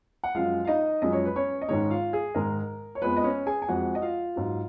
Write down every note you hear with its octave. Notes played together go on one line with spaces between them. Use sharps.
F#5
F#2 F3 G#3 F4 F5
F5
D#4 D#5
F#2 F3 G#3 D#5
C#5
B4
C#4 C#5
D#5
G#2 D#3 G#3 C#4 C#5
F4 F5
G#4
G#2 D#3 G#3 A#4
C#5
F2 F3 G#3 B3 B4
D#5
C#4 C#5
G#4 G#5
G#5
F2 F3 G#3 F#4 F#5
D#5
F4 F5
G#2 F#3